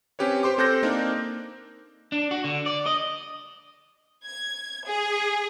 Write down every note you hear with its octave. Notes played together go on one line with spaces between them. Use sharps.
C4 C#4 G4 B4 C#5
G4 C5 C6 D6
C4 A4 C5 F#6 G6 A#6
A#3 C4 D4 D#4 A#4
D4
F#4
D3
D5
D#5
G#6
G#4